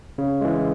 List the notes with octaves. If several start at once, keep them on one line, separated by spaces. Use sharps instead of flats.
C#3
E3 G#3